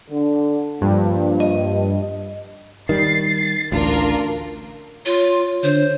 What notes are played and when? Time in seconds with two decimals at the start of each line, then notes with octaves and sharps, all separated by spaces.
0.10 D3
0.81 G2 F3 A#3
1.40 D#5
2.89 D#3 G3 A6 C7
3.72 A1 D2 D4 F4 A#4
5.06 F4 C#5
5.63 D3 C5 C#5